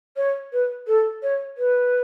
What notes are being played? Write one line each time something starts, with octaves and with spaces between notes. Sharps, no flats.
C#5
B4
A4
C#5
B4